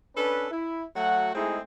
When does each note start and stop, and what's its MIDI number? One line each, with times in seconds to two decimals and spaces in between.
0.16 0.46 61
0.16 0.46 62
0.16 0.46 69
0.16 0.46 71
0.51 0.83 64
0.96 1.33 54
0.96 1.33 57
0.96 1.33 66
0.96 1.33 78
1.34 1.60 56
1.34 1.60 57
1.34 1.60 60
1.34 1.60 63
1.34 1.60 64
1.34 1.60 68